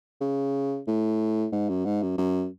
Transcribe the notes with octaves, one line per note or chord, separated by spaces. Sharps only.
C#3
A2
G#2
F#2
G#2
F#2
F#2